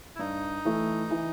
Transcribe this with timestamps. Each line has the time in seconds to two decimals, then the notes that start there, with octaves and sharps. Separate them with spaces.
0.16 E4
0.19 G2 D#4
0.65 E3 A3
1.11 E3